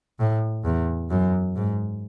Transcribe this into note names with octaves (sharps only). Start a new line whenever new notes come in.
A2
E2
F#2
G#2